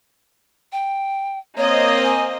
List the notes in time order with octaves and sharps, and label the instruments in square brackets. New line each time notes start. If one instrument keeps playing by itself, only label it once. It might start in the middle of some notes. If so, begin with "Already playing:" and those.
[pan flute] G5
[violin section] A#3 C4 D#5 [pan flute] C#5
[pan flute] G#5